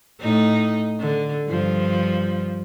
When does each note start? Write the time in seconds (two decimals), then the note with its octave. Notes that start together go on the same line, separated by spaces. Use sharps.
0.20 A2 D#4
1.00 D3
1.49 G2 F3